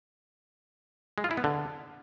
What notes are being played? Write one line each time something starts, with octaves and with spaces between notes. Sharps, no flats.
G#3
F4
E4
B3
D3